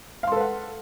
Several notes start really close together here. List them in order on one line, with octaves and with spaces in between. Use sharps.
F5 C6 A4 B4 F#5